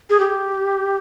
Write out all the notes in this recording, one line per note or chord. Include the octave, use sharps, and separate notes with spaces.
G#4
G4